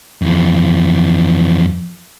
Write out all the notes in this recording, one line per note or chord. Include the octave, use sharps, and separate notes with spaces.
F2 E3